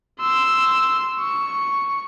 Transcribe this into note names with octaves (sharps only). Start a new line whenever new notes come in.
C6 E6
C#6